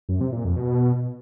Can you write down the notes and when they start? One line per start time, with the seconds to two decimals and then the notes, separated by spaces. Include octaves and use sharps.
0.09 F#2
0.21 C3
0.33 A#2
0.44 F2
0.56 B2